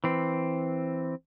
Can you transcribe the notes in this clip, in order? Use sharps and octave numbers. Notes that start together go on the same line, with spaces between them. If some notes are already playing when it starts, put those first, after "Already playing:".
E3 C4